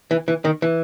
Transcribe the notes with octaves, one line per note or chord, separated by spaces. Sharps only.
E3
E3
D#3
E3